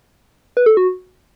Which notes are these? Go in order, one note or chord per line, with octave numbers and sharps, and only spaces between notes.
B4
A4
F#4